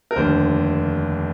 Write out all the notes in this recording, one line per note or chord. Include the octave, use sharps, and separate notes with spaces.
A#4
F1 D#2 D3 C5